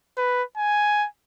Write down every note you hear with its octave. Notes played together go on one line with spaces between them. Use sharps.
B4
G#5